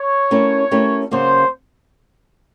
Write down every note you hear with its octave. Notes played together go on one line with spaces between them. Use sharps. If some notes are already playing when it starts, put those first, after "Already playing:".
Already playing: C#5
A3 C#4 E4 G4 A#4
A3 C#4 E4 G4 A#4
C#3 F#3 A#3 C5